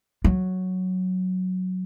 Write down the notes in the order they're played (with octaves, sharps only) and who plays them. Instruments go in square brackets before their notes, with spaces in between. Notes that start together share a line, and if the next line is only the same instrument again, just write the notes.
[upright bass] F#3